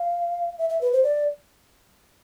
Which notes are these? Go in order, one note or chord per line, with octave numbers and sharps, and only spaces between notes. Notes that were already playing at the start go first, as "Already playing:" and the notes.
Already playing: F5
E5
E5
B4
C5
D5